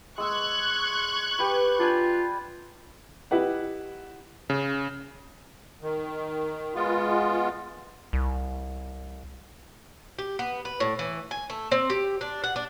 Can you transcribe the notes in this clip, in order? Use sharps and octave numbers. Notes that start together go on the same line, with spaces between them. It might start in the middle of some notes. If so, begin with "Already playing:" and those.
G#3 C#6 E6 F#6 G#6
G4 B4
D4 F4 G5 G#5
E4 G4 B4 D#5 F#5
C#3
D#3
G#3 B3 F4
C2
G4
B3
B4
A2
E3
G#5
A3
C4
G4
D4
F#5
D4